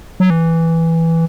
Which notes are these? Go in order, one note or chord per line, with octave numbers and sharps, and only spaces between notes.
F#3
E3